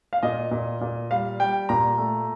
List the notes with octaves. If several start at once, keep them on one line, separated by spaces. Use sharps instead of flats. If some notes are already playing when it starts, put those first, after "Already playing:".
F5
A#2 D#5
A#2
A#2
G3 F5
G3 G5
A#2 A#5
A3